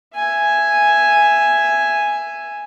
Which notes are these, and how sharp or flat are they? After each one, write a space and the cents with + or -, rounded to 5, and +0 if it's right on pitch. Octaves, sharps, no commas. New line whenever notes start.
E5 +10 G#5 +0